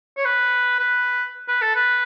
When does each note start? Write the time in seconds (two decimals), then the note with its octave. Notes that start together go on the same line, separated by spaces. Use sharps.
0.17 C#5
0.25 B4
0.79 B4
1.48 B4
1.62 A4
1.75 B4